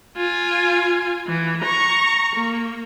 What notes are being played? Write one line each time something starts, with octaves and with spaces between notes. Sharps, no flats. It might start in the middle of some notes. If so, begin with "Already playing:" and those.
F4 G#5
E3
A#5 C#6
A#3